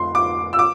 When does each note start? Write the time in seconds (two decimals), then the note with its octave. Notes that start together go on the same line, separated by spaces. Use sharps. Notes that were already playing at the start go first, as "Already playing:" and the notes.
Already playing: F1 C6
0.15 D6
0.53 E6
0.59 D6